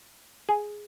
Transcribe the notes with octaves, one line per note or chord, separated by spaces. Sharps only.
G#4